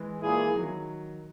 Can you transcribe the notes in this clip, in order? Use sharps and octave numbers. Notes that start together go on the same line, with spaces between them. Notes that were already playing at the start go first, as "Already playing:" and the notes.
Already playing: E3 G#3
A#2 A#3 E4 G#4
E3
D#3 F#3